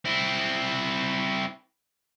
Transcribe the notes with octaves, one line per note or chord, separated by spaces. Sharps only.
C4 E4